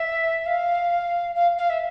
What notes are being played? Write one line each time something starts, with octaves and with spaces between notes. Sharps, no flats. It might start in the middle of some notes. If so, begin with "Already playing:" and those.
Already playing: E5
F5
F5
F5
E5